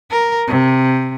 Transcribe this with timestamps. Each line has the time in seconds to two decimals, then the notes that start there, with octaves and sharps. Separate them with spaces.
0.11 A#4
0.48 C3